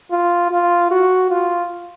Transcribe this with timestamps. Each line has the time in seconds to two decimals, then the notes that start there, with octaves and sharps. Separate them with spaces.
0.11 F4
0.52 F4
0.91 F#4
1.31 F4